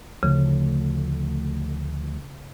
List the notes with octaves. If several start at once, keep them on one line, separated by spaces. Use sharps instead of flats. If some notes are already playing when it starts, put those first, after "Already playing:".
D2 C#3 F3 A3